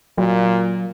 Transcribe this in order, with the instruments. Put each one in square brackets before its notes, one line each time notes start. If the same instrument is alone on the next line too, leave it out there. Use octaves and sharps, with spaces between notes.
[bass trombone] A#2 [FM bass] F#3